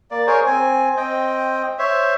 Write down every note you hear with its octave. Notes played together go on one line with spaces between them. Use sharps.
A#3 D5
G#4 A#4 C5 C#5
C4 G#5
C4 D#5 G5
C5 C#5 E5